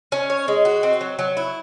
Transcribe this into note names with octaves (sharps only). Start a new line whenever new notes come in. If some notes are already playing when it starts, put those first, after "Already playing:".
C#4
C#5
G#3
F#4
C4
F#3
F#3
E4